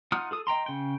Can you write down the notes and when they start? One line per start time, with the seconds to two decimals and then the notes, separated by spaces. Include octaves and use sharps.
0.12 D#4 F4 F#5 D#6 F6
0.31 G#4 A4 D#6
0.47 D#5 G5 A#5 C6
0.66 C#3 G5